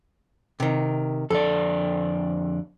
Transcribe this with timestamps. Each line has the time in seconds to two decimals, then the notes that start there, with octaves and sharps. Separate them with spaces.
0.60 C3 D#3
1.30 F2 D3 A4 D5